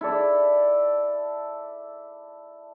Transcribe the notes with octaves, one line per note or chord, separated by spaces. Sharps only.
E4 A4 D5